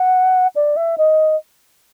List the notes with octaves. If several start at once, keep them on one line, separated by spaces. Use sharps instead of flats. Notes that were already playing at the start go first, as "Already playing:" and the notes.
Already playing: F#5
D5
E5
D#5